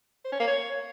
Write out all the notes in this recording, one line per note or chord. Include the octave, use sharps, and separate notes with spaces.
C5
C#4
A#3
C#5